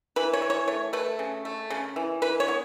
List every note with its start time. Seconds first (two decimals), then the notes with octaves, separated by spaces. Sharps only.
0.16 E3 B4
0.33 C#5
0.42 E3
0.50 C#5
0.67 A3 C#5
0.93 A3 B4
1.19 C#3
1.45 A3
1.70 C#3
1.96 E3
2.22 E3 B4
2.40 C#5
2.48 B3